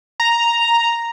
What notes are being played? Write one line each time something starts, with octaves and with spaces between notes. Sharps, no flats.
A#5